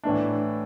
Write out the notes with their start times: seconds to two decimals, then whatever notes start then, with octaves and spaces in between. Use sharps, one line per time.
0.04 A2 E3 A3 D4